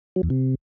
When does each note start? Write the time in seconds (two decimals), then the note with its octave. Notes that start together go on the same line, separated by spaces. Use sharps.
0.16 F#3
0.23 E2
0.30 C3